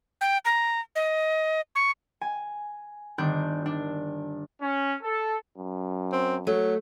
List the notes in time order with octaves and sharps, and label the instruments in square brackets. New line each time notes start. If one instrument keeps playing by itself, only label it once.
[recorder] G5
A#5
D#5
C#6
[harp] G#5
G1 D#3 D4 G6
D4
[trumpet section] C#4
A4
[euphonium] F#2
[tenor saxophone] C4
[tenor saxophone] F#3 [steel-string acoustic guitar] A3